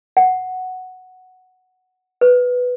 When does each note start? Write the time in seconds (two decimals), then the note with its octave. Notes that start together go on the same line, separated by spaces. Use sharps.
0.17 F#5
2.21 B4